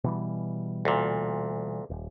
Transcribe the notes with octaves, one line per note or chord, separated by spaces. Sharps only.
B2 E3 G3
D2 A#2
D#1